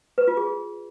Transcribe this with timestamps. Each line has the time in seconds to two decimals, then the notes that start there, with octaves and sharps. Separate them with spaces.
0.18 B4
0.27 F4
0.37 G#4